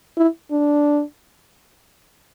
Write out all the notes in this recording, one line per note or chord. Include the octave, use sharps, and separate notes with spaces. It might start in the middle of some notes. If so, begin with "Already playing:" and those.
E4
D4